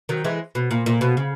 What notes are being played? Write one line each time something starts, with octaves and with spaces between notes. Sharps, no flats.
D#3 F#3
E3 G#3
B2
A#2
A#2
B2
C#3